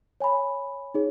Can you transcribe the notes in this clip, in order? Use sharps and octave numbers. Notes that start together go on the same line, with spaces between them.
C#5 G#5 B5
D#4 G#4 C#5